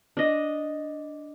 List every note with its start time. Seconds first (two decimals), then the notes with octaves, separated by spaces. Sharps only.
0.17 D4 D#5